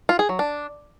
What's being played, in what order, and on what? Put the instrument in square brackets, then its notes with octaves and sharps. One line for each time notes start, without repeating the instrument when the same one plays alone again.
[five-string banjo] F4
G#4
F#3
D4